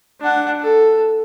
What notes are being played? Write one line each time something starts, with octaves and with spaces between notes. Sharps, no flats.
D4 F#5
A4